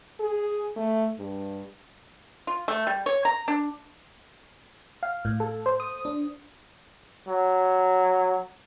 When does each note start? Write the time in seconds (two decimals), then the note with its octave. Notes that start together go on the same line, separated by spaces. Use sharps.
0.20 G#4
0.76 A3
1.19 G2
2.47 F4
2.68 A3
2.87 G3
3.06 C#5
3.25 A#5
3.48 D4
5.03 F5
5.25 A2
5.40 A4
5.66 C5
5.80 D#6
6.05 D4
7.28 F#3